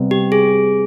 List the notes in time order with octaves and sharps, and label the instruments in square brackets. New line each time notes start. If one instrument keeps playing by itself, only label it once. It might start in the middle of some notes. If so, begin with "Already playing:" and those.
Already playing: [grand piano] C3 G3 B3
[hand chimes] G4
G#4